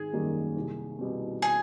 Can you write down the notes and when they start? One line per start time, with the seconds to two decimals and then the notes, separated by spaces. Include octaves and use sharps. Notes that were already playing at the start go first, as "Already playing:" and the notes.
Already playing: G#1 G#4
0.13 F#2 D#3 G3 A#3
0.56 C2
0.99 B2 G3 C4
1.42 G#4